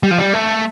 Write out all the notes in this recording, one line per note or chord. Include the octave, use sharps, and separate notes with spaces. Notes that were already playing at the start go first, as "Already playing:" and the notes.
G3
F3
G3
A3